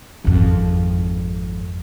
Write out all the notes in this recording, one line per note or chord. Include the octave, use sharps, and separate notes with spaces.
G#1 F2